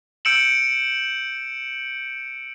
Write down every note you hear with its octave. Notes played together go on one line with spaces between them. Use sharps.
E6 G6 C#7 D7 E7 F#7